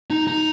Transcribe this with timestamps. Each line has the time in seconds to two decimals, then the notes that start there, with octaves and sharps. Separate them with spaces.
0.10 D#4
0.27 D#4